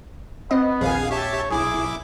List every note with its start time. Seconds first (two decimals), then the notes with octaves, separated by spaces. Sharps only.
0.51 B3 C4 D#5
0.81 A#1 D#2 G#4 F5 G#5
1.11 G4 C#5 E5 A5
1.51 B1 E4 G#4 D6